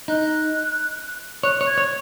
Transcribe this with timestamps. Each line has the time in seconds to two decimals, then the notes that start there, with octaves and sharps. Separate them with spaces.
0.08 D#4 F#6
1.43 C#5 F#6
1.61 C#5
1.66 G#6
1.78 C#5